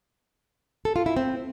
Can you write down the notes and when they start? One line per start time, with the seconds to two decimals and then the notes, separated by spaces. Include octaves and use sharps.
0.85 A4
0.96 F4
1.06 E4
1.17 C4